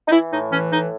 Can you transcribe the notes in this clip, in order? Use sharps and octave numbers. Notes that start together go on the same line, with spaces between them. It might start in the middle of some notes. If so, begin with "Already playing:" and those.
D#4
E3 E4
A2 D#4
E3 C#4
A2 D#4